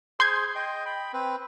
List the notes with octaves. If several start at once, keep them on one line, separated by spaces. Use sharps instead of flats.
G#4 C5 C6 G6 G#6
D#5 G5
G5 B5
C4 B4